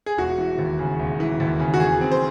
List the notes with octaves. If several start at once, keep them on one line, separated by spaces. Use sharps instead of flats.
G#4
E1 F#4
E3
D#2
C#3
E1
E3
D#2
C#3
F#4
E2 G#4
C4
C5